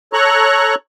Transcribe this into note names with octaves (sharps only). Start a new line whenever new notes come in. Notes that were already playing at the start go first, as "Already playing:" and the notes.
A4 C#5 A#5 C#6 F#6